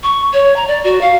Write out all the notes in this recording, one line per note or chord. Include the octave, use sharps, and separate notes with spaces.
C#6
C#5
A#5
D5
F#4
F5